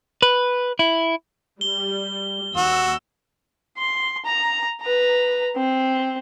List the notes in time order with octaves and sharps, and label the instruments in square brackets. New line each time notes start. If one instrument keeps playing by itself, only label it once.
[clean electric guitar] B4
E4
[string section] G3 [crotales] G7
[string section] D#2 E6 [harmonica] F#4
[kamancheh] C6
A#5
B4 A#5
C4